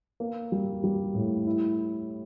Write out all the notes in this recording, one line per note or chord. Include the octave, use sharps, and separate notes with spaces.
A#3
G3
G3
A2
E4